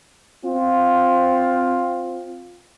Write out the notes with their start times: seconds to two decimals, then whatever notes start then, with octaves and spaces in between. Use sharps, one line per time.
0.45 C4 F4